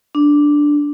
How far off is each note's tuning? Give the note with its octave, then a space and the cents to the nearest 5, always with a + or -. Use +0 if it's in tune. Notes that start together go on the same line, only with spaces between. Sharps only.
D4 +0